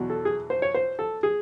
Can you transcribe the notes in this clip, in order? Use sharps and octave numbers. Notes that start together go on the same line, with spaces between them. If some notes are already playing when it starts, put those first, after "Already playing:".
Already playing: E2 B2 F#3
A4
G#4
C5
C#5
C5
A4
G#4